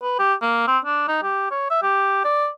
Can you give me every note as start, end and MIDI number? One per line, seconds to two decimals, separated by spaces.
0.02 0.19 71
0.19 0.34 67
0.42 0.67 58
0.67 0.78 60
0.85 1.03 62
1.08 1.18 63
1.23 1.49 67
1.51 1.67 73
1.71 1.82 76
1.83 2.22 67
2.25 2.48 74